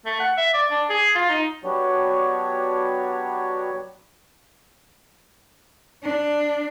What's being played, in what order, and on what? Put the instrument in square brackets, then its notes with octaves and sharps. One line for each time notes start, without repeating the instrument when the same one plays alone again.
[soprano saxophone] A3
F#5
E5
D5
D4
G#4
F4
D#4
[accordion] F#3 B3 D4 F#4 G4 C#5
[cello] D4